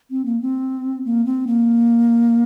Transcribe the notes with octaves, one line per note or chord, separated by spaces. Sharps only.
C4
A#3
C4
A#3
C4
A#3